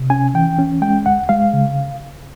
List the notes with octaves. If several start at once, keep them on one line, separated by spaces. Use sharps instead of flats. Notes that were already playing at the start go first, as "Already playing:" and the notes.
Already playing: C3
C#4 G#5
E3 G5
C#4
G#3 G5
D2 F#5
G#3 F5
C#3